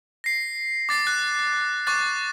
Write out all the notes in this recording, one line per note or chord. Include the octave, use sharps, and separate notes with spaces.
A#6 C7
D6 A6 C7
F#6
C#6 D6 F#6 A6